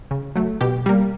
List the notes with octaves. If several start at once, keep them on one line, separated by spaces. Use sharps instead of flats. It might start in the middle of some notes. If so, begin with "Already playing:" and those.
C#3
F#3 A3
B2 G4
G3 A#3